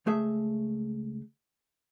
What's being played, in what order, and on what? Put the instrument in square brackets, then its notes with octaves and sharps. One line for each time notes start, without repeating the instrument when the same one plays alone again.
[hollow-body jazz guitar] C#2 A3 G#4 E5